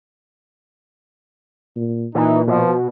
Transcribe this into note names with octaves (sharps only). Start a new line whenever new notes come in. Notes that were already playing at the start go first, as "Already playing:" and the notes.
A#2
A#2 E3 D#4
B2 F3